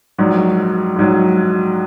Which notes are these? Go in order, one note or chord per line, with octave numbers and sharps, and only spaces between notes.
A#1 G#2 F#3
A#1 G#2 F#3